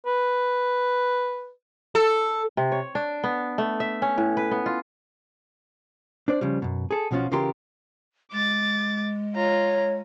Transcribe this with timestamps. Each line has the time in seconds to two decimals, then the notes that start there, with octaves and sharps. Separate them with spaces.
0.06 B4
1.95 A4
2.57 C3
2.72 C#5
2.95 D4
3.24 B3
3.58 A3
3.80 E5
4.02 C#4
4.18 A2
4.37 B4
4.51 B3
4.66 F4
6.28 D4 C5 D5
6.41 C#3 F3 G3
6.62 F#2 B2
6.91 G#4 A4
7.11 B1 B2 F3 C#4 F4 F#4
7.32 C#3 E3 F4 G4 A#4 C6
8.32 G#3 D6 A6
9.35 F4 C#5 A#5